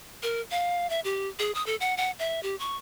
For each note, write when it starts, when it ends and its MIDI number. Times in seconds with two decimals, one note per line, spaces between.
0.23 0.41 70
0.51 0.87 77
0.90 1.00 76
1.04 1.28 67
1.39 1.52 68
1.55 1.63 87
1.66 1.76 69
1.80 1.96 78
1.97 2.11 78
2.19 2.40 76
2.43 2.56 67
2.59 2.77 85